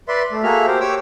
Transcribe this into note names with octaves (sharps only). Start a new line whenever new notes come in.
B4 D5 E5 C6
A3
A#3 F#4 G#4 A4 E5 F6
G4 C5
G4 C#5 D6 E6